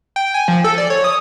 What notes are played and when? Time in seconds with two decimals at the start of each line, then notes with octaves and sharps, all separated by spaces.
0.16 G5
0.34 G#5
0.48 F3
0.64 A4
0.78 D5
0.90 C#5
1.04 D#6